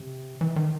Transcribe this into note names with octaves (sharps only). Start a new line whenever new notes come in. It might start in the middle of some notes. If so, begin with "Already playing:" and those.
Already playing: C3
E3
D#3